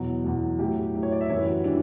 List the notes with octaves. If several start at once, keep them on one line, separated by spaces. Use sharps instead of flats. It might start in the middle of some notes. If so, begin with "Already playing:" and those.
Already playing: E2 B2 F#3
E2 B2 F#3
A2 F#3 G4
A2 F#3
C#5
D5
E5
F#2 E3 G3 C#5
B4
F#4
E3 G3 D4